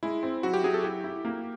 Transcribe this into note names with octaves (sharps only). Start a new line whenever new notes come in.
G#3 E4
C4
F#3 F#4
G4
F#3 G#4
A4
E4 G4
E4
A#3